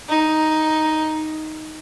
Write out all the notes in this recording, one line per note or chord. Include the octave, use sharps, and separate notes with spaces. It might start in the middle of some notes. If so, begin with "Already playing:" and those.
D#4